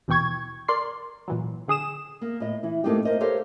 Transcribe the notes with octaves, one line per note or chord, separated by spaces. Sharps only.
D#2 B2 E3 G5 C#6 G#6
A#4 D5 C6 C7
A#2 E3 F#3
D3 G#4 D#6 E7
A#3
A2 D#5
E3 E4
G#2 A3 A#3 C4 D#4 G4
A#4 C5 D#5
G4 A4 A#4 C5 C#5 F5